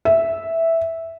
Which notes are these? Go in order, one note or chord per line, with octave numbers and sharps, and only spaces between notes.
E5